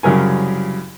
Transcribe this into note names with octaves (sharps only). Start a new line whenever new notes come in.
C2 F#2 C#3 A#4 G#5